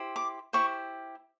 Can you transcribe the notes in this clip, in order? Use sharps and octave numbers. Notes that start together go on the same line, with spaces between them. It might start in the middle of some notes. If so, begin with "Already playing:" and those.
Already playing: E4 G4 C5
D6
E4 G4 C5 C#6